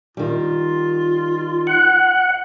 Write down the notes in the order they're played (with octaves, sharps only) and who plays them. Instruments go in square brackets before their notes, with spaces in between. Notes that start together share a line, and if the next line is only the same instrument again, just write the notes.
[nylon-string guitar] D#3 G3 [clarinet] F4
[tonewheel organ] F#5